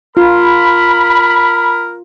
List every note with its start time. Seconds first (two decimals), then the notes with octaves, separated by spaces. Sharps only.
0.17 F4 A#4 B5